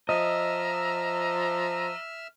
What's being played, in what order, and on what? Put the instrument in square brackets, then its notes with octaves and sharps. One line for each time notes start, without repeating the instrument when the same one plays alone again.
[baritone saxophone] F3 [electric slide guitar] D#5 [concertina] E5 E6 F6 [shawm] A#5